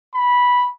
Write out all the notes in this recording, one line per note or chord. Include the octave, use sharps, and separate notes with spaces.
B5